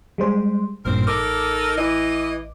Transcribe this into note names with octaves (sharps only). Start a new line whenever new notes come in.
G3 G#3 C5
A1 G2 A#2 C4 A#4 C5
A1 D#4 A4 A#4 D6
E3 D#5